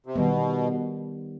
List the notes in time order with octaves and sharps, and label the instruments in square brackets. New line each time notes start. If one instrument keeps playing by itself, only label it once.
[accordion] C3
[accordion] B2 [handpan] D#3 G3 B3